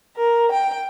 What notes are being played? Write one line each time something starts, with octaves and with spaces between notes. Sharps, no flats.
A#4
G5